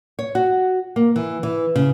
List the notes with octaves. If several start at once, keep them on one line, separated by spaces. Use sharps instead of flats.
C#5
F#4
A#3
E3
E3
C#3